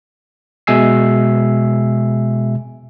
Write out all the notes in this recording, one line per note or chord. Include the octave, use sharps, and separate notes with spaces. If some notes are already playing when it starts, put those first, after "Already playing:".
B2 G#3 E5 G#5 E6 C7